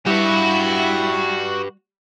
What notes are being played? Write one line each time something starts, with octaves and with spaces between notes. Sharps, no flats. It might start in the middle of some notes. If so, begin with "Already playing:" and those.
G3 E4 F#4 G4 B4